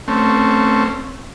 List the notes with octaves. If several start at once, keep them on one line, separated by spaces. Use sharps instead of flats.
A3 C4 C#4